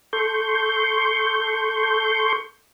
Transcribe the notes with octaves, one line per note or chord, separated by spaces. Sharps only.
A4 C6 C#6 G6